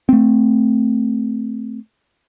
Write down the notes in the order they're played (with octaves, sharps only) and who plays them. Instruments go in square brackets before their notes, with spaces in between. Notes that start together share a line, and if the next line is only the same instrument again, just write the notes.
[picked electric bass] A3 C4